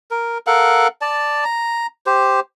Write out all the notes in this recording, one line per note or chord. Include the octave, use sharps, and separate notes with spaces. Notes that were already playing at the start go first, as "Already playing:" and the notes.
A#4
A4 A#4 F5 F#5
D5 A5
A#5
G4 C5